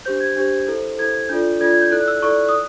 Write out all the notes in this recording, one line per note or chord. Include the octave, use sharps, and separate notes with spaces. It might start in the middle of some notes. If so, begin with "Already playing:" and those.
D4 G4 C5 G6
G#6
D4 G4 C5
E4 A4 C5
E4 A4 C5 G#6
D4 F4 A4 D5 G6
D4 F4 A4 D5 G#6
G#6
G6
E4 A4 D5 F#6
E6
E4 A4 D5 C#6
D#6